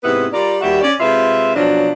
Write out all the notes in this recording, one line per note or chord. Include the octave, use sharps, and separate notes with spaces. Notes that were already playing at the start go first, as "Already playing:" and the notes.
G#2 C3 B3 E4 B4
G3 F4 A#4 D5
D#2 G3 F#4 G4 E5 F#5
C#4 D5
C3 G#3 F4 B4 E5
B2 F3 F#3 C#4 D4